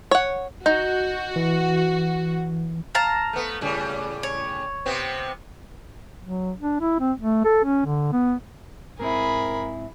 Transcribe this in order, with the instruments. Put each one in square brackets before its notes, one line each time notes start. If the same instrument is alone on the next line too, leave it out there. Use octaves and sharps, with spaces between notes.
[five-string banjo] C#5 F#5
[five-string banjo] D#4 [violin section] F#4 [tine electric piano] G6
[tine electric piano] E3
[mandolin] F5 A5 A#5
[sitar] A3 B3
A2 C#3 G3
[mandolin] C#5
[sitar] C3 B3 C4
[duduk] F#3
D4
E4
C4
A3
A4
C#4
D3
B3
[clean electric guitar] G#2 C4 E4 [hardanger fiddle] G#4 B5 [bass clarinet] A#4